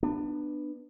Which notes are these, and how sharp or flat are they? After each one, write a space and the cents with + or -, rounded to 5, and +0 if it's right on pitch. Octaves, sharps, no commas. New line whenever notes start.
B3 +0 D4 +20